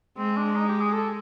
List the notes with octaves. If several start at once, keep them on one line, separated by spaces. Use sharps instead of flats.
G#3 C4
D4
D#4
G4
G#4
A4